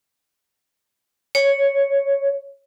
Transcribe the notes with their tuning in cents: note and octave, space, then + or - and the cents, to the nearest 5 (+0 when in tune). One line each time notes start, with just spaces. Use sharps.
C#5 +0